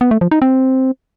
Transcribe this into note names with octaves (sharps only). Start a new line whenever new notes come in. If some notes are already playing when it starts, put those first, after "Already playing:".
B3
A3
F3
D#4
C4